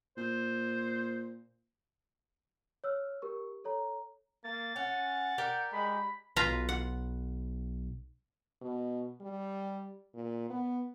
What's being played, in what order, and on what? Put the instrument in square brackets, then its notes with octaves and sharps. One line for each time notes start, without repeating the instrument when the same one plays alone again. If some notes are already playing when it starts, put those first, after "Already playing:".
[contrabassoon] A#2 [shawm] C5
[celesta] C#5 E6 F6
G4 A#4 C#6
A4 C#5 A#5
[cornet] A#3 [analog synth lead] A6
[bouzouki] C#4 [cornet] F#5
[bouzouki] G4 A#4 D5
[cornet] G#3 [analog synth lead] B5
[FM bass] B1 [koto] F4 B4 A#5
[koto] F#5
[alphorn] B2
G3
A#2
B3